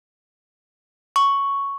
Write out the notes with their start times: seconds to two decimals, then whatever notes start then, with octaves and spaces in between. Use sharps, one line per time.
1.16 C#6